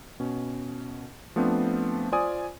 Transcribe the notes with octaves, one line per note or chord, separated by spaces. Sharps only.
B2 C#4
F3 A3 B3 C4 D4
F4 C5 D5 G#5 D#6